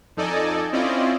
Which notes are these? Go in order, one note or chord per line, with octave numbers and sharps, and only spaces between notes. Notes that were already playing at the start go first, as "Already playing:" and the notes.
F2 D#4 A4 D5 D#5 G#5
C4 C#4 E4 F4 D5 D#5